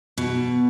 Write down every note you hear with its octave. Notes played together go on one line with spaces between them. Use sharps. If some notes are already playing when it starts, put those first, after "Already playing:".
B2